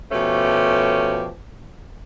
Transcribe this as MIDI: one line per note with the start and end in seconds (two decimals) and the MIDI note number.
0.12 1.27 47
0.12 1.27 53
0.12 1.27 57
0.12 1.27 61
0.12 1.27 67